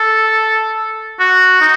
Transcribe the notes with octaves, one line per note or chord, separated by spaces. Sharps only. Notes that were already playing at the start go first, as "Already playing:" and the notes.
Already playing: A4
F#4
D#4